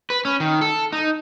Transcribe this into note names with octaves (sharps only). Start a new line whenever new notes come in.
B4
C#4
D#3
A4
D#4